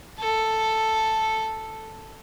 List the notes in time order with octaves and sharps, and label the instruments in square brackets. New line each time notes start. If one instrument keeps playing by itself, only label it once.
[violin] A4